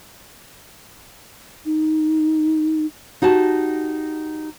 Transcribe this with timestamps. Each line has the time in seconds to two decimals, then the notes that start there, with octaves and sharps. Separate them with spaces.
1.65 D#4
3.22 D#4 F#4 G4 A5